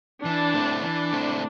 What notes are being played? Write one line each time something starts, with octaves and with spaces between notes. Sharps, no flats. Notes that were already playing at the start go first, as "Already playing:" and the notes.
E3 D4
A3 C4 E4
E3 D4
A3 C4 E4